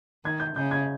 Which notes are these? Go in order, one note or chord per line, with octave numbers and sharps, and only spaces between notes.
D#3 G#6
G6
C#3 G6
G#6